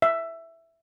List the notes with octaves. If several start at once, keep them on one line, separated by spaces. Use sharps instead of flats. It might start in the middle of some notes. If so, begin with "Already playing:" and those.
E5